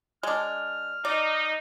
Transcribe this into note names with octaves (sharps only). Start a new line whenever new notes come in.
G#3 D4 F6
D#4 D5